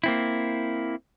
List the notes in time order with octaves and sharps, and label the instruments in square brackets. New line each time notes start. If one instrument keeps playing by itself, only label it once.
[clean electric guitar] A#3 C4 E4